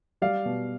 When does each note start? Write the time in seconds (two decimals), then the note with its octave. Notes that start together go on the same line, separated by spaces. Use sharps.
0.22 G3 D5 F5
0.45 B2